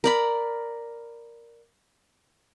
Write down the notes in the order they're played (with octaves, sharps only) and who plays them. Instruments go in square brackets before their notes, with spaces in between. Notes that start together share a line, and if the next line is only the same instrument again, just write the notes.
[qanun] A#4 D5 B5